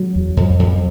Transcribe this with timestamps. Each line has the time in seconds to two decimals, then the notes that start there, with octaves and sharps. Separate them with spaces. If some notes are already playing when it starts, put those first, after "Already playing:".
Already playing: F#3
0.16 E2
0.37 F2
0.59 F2